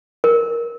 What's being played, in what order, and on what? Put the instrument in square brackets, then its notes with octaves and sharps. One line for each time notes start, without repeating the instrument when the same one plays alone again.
[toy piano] A#4